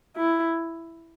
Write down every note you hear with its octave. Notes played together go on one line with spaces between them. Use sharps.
E4